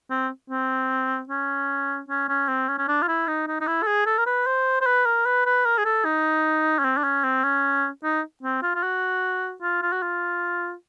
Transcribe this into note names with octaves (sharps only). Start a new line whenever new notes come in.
C4
C4
C#4
C#4
C#4
C4
C#4
C#4
D4
F4
E4
D#4
D#4
D#4
E4
A4
G#4
A4
A#4
B4
C5
C5
B4
A#4
B4
B4
A#4
G#4
A4
D#4
C#4
C4
D4
C#4
C4
C#4
D#4
C4
F4
F4
F#4
F4
F4
F#4
F4